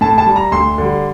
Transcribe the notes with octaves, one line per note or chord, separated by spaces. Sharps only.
A2 A5
A5
G3
A#5
D2 C6
D3 G3